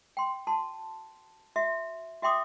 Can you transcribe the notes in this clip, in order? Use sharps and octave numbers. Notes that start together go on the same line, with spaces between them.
G5 C6
F#4 A5 C6
F#4 E5
F#4 E5 G5 C6 D6 D#6